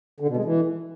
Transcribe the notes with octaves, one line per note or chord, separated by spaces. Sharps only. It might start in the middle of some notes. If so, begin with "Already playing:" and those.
D3
B2
G#3
E3